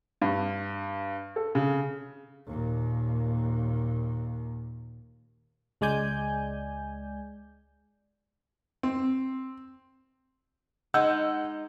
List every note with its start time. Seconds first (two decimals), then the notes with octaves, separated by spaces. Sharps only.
0.22 G2
1.36 A4
1.55 C#3
2.46 D#2 A#2
5.81 C#2 G#3 D5 G#5 G6
8.83 C4
10.94 G#3 D#4 F#5 E6 G6